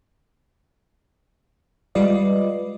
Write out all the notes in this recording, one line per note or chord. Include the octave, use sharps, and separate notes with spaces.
G3 G#3 F4 B4 D5 D#5